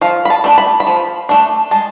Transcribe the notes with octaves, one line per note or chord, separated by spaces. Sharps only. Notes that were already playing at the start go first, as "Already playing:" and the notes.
F3 F5
B5
A5
A3 D4
B5
B5
F3
A3 D4
G#3 A5